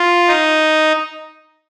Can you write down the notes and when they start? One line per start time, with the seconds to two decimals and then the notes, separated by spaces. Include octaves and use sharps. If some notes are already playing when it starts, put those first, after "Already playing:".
Already playing: F4
0.28 D#4